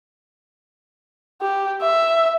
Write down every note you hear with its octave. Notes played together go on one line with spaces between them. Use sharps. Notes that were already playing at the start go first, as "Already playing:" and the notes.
G4
E5